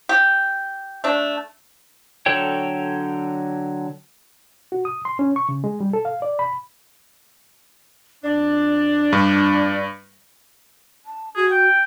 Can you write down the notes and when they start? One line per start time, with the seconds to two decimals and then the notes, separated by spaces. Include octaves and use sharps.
0.09 G4
1.04 A3 D4
2.26 D3 F#3 A4 C#5 G5
4.72 F#4
4.85 D#6
5.05 C6
5.19 C#4
5.36 C#6
5.49 C#3
5.64 G#3
5.81 G3
5.93 A4
6.05 F5
6.22 D5
6.39 B5
8.24 F2 D4 D5
9.13 G2
11.06 A5
11.36 F#4 G#4
11.51 G5